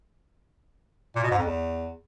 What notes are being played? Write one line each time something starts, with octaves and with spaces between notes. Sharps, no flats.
A#2
B2
G#2
F2
E2